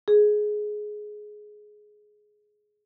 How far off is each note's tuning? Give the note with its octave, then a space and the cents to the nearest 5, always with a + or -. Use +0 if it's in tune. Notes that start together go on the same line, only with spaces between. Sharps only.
G#4 +15